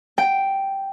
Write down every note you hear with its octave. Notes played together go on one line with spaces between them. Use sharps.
G5